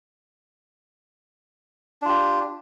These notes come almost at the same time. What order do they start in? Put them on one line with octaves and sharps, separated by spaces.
D4 F4 G4